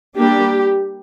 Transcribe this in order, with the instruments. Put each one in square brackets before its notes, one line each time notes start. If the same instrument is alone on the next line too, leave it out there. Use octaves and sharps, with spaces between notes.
[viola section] G3 A#3 D4 G4